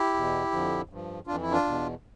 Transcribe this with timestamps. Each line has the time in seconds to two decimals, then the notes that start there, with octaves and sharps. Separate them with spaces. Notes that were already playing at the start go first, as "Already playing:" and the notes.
Already playing: E4 G4
0.14 E2 B2
0.51 F2 D3 F3
0.89 G2 F3
1.27 F2 E3 D4 F4
1.42 E4
1.52 D4 F4
1.64 E2 B2